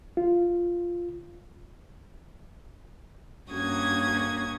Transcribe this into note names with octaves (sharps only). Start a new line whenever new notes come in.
F4
G2 A#3 C#4 F#4 D#6 G#6